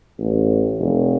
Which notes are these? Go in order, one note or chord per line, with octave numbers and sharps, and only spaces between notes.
A1
F1